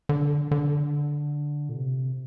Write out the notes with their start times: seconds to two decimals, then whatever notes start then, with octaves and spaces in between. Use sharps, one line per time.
0.09 D3
0.51 D3
1.69 A#2
1.75 C3